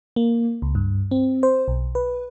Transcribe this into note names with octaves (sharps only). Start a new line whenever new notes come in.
A#3
C#2
G2
C4
C5
B1
B4